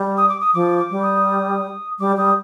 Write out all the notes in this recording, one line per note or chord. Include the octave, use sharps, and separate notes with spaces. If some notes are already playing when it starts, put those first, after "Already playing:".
Already playing: G3
D#6
D6
D#6
F3 D6
D6
G3
D#6
G3 D6
G3 D#6